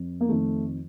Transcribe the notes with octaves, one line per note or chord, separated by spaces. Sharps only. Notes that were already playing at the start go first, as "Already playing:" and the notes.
Already playing: F2
A#3
F2 D#3 A3